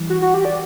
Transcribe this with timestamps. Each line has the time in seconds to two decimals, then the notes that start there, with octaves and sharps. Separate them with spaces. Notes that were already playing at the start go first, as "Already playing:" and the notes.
Already playing: E3 G3
0.10 F#4
0.22 F#4
0.34 G4
0.45 D5